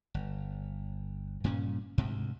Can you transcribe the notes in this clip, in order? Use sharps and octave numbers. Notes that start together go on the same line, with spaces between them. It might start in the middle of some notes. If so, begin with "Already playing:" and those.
G1
G2 A#2 C#3 C#4
D2 G#2 C3